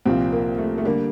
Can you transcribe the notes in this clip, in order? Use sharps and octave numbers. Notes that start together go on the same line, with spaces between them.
C2 A#2 F3 C4
A#3
A3
A3
D3 G3 A#3